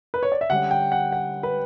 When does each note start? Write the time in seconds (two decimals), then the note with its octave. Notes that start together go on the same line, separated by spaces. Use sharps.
0.14 B4
0.23 C#5
0.32 D5
0.41 E5
0.50 D3 G3 C#4 F#5
0.71 G5
0.92 F#5
1.12 F#5
1.43 B4